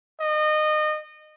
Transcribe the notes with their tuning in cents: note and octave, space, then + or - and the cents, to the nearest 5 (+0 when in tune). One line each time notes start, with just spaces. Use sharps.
D#5 -25